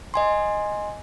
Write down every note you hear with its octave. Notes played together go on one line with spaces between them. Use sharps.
D#5 G#5 C6